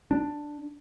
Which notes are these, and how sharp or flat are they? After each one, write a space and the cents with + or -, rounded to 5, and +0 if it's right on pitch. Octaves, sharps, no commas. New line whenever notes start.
D4 +5